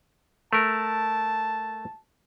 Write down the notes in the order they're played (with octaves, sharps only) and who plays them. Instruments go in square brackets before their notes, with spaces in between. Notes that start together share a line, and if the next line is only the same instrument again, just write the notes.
[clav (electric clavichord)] A3 A#4 [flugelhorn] A5